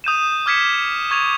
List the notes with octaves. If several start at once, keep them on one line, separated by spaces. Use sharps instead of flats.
D#6 G6 D#7 E7
D6 F6 G#6 B6 C#7 E7
C#6 G#6 A6 F7